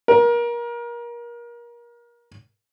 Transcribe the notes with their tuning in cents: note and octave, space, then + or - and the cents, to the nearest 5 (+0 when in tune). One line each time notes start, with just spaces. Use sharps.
A#4 +30